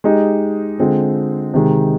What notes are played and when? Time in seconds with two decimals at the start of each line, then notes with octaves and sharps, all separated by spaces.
0.04 G#3 D#4 G4
0.78 D3 G#3 C4 F4
1.54 C3 D#3 G#3 D#4